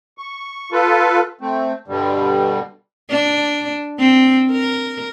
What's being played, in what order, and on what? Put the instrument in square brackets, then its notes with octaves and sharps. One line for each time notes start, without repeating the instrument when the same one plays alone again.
[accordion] C#6
F4 A4 B4
A3 C4
G2 B2 D3 G3
[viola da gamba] D4
C4
A#4